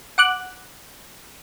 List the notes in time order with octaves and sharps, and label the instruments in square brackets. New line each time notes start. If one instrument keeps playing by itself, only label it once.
[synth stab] F#5 D6 F#6